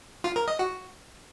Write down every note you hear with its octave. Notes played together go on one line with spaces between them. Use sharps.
F4
A#4
D#5
F#4